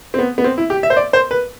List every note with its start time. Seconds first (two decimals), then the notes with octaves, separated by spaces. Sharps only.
0.14 C4
0.19 B3
0.38 B3
0.44 C4
0.58 E4
0.70 G4
0.83 E5
0.90 C5
0.97 D5
1.13 C5
1.31 B4